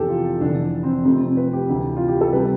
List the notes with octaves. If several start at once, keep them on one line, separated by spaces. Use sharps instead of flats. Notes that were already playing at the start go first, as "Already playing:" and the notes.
Already playing: F1 E2 C3 G4 A4
F4
F1 E2 D3 D4
C4
F2 C3 F3 A3 C4
C4
B4
G4
D2 C3 E3
F4
G4
A4
C3 G3 B4